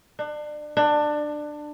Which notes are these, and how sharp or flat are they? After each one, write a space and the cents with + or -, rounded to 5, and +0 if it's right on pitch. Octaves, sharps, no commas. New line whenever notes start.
D4 +30
D4 +20